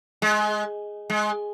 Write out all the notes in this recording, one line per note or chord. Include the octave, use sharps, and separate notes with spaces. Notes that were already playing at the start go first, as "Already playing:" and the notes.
G#3
G#3